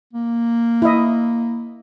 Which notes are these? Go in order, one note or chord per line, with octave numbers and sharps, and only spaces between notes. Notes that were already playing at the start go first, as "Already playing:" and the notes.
A#3
E4 D#5